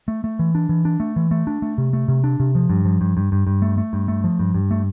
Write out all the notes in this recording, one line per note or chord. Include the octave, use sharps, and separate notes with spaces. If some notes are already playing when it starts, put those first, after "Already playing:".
A3
A3
E3
D4
E3
D4
A3
E3
A3
D4
A3
C3
A3
C3
D4
C3
F3
G2
F3
G2
G2
G2
G2
A3
A3
G2
A3
F3
G2
G2
A3